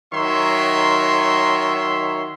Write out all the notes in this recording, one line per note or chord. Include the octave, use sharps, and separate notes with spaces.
D#3 F#3 C#5 E5 C6